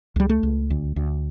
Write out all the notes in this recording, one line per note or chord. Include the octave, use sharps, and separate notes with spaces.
C#2 G3
A3
C#2
D2
D2